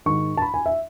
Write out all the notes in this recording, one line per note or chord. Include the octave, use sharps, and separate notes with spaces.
G#2 D#3 C#6
A5
B5
G#5
E5